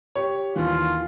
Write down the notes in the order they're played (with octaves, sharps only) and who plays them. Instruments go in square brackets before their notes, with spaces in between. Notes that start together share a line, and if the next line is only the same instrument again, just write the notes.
[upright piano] G4 C#5
[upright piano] D#2 E3 [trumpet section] F4